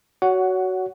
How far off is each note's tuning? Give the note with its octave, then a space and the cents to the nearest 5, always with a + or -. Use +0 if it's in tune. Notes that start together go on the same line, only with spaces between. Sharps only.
F#4 +15 C#5 +25 F#5 +0